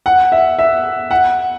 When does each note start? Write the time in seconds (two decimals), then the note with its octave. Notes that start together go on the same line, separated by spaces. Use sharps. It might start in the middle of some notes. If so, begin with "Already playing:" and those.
0.06 F#5
0.32 E5
0.58 E5
1.11 F#5